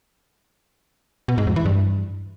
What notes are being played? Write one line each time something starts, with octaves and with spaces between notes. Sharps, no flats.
B2
G#2
F2
E3
G2